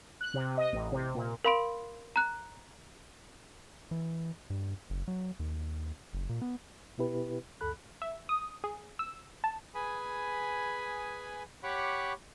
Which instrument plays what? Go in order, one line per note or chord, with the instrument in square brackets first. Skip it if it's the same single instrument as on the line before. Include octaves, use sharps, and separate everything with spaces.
[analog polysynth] F#6
C3
D#5
A1
C3
A#2
[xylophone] A#4 F5 B5 C6 D7
A#5 F#6
[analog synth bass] E3
G2
F#1
F#3
D#2
F#1
A#2
B3
[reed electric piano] B2 B3 E4 G4 B4
D2 G2 A4 B5 F#6
[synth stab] E5
D#6
G#4
E6
A5
[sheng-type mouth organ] G#4 B4 G#5 B5 D#6
G4 C#5 F#5 B5 C#6 D6